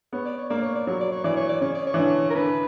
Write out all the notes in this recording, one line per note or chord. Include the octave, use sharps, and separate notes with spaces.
B3 C#5
D5
C#5
A#3 D5
C#5
D5
F#3 C#5
D5
C#5
E3 D5
C#5
D5
C#3 C#5
D5
C#5
E3
D3
A#4
D3 B4